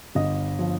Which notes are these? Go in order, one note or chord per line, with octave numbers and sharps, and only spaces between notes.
G1 D#5
F3